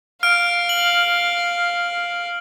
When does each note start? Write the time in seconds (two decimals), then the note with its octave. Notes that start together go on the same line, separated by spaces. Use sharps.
0.23 F5 F6 D7
0.69 F#7